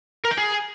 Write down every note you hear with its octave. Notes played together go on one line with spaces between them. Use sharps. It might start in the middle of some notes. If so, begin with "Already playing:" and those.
A#4
G5
G#4